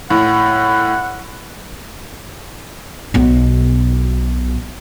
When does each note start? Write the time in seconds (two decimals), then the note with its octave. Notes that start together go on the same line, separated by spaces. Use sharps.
0.10 A2 F#5
3.14 B1 B2